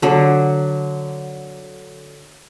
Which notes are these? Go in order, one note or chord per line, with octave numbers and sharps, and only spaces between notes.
D3 F#3